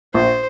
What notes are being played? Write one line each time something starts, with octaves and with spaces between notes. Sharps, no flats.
A#1 C5